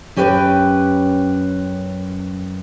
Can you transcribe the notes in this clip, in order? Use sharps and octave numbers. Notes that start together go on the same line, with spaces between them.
F#2 C#4 G4 B4 G5